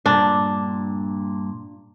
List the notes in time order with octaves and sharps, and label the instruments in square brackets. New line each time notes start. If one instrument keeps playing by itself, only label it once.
[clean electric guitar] G2 A#2 [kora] D4